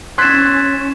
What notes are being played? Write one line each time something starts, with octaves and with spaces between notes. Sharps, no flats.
C#4 C6 E6 F#6 G#6 A6 B6 E7